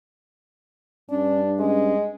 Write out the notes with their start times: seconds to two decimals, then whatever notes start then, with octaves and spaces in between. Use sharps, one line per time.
1.10 G2 C#4 D4
1.59 G#3 C#4